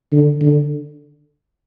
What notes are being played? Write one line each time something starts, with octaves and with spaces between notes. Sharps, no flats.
D3
D3